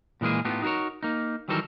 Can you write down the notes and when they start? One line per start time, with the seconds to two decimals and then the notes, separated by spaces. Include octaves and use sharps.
0.21 A#2 E3 G#3 A#3 G#4
0.45 A2 A3 B3 D#4 F4 G4
0.62 D#4 F#4 G#4 A#4 C#5
1.03 A#3 D#4
1.48 D#3 E3 F#3 G3 A4 A#4